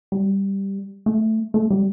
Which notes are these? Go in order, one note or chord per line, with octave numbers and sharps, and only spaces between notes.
G3
A3
A3
G3